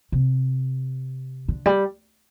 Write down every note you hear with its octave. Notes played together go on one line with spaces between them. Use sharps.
C3
D3
G3